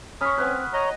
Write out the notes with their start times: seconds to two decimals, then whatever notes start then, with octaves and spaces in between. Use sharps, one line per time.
0.21 C#4 B5 C#6 D#6 F6 B6
0.38 C4 B4 F#5 G#5
0.74 C#5 D#5 A#5